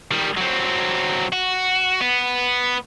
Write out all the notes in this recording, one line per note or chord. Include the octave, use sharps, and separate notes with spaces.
D#3 G3
F#3 C4
F#4
B3